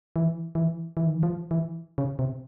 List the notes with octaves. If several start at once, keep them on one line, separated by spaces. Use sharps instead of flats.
E3
E3
E3
D#3
E3
F3
E3
C#3
C3